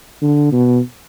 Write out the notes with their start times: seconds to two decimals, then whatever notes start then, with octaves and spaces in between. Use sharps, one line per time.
0.22 D3
0.52 B2